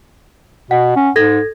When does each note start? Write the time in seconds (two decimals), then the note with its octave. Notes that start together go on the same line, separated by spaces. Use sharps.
0.71 B2 F#5
0.96 C#4
1.16 G#2 A4 G#6 A#6